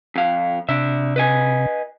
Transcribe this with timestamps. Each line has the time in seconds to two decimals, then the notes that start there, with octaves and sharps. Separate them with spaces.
0.16 F2 F5
0.69 C3 D4 E5
1.16 B4 D#5 G#5